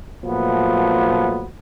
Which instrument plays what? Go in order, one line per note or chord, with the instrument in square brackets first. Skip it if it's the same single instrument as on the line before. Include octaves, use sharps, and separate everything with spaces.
[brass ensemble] A#2 F3 F#3 A3 B3